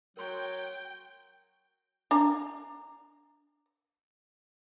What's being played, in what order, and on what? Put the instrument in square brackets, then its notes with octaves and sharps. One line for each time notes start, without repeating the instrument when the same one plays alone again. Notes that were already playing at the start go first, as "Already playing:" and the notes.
[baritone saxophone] F#3 [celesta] A#4 C6 [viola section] G5
[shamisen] D4 A#5